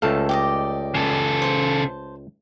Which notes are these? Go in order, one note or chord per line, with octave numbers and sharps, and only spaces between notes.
C#2 A3 A4 F5
G4 D5 D#5
C#3 A4
C5 A5